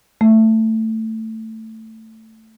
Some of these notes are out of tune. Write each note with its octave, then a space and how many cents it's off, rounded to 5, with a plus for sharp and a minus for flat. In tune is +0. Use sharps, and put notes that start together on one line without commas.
A3 +15